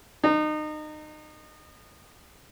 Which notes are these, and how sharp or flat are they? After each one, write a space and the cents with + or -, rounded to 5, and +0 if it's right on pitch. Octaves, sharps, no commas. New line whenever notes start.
D#4 -30